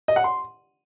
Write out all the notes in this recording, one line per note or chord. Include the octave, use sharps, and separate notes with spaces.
D#5
F#5
C6